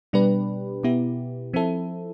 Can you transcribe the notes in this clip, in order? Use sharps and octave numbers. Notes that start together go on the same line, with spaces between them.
B2 G3 D4 G4 B4
B2 B3 E4 G4
F3 C4 E4 A4